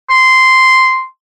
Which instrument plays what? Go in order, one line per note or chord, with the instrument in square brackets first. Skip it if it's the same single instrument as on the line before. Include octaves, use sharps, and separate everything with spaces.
[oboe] C6